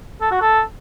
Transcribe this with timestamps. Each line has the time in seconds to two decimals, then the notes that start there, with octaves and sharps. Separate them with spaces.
0.21 A4
0.31 F#4
0.41 A4